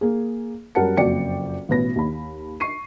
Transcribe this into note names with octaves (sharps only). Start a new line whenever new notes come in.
A#3 G#4
F#2 G3 A#4 F#5 A5 C#7
F#1 F2 F#4 D5 G5 C#7
A1 B2 B4 A#6
D#2 B5
C#6 C7 D#7